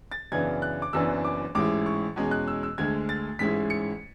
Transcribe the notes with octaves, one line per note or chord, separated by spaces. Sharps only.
A6
F#2 C#3 E3 B3 D4 G#6
F#6
D6
F#1 F#2 E3 B3 D4 E6
D6
A1 G#2 G#3 C#4 E4 D6
C#6
E2 B2 G#3 C#4
F#6
E6
E6
D2 D3 G#3 G#6
A6
A1 G#2 G#3 C#4 E4 B6
C#7